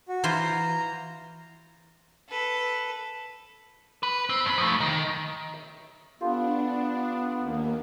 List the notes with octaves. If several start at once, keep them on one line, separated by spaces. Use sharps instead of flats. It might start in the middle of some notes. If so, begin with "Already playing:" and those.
F#4
E3 F4 C5 A#5
A4 B4
B4
C4
G2 B5
F3 A3
D#3
E5
B3 D4 F4 G4 A4
D#2 A#3